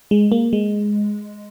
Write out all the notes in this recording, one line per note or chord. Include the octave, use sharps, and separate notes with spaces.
G#3
A#3
G#3